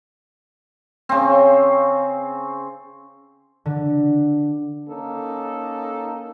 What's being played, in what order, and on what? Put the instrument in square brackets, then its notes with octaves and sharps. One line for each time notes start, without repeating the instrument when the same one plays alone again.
[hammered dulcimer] C#3 C4
[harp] D3
[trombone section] A#3 C#4 D#4 A4